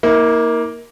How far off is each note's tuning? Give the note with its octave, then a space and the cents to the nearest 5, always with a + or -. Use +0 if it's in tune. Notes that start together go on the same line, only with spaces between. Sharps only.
A#3 +5 E4 -45